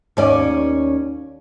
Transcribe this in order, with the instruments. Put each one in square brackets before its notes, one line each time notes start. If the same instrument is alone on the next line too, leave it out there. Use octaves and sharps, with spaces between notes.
[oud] D#2 C#4 D5